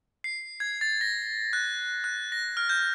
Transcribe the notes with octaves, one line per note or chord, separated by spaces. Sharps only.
C7
G#6
A6
A#6
F#6
F#6
A#6
F6
G6